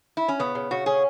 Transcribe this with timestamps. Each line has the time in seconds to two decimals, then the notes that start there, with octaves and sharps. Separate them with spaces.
0.17 E4
0.28 C#4
0.39 C#3 B3
0.55 C#3
0.71 C#3 F#4
0.86 C#4 G#4